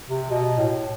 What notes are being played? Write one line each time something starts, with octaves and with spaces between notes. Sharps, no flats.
C3
B2
A2